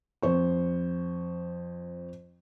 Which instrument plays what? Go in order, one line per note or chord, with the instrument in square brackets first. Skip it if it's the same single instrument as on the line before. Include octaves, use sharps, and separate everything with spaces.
[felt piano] F2 C5 C#6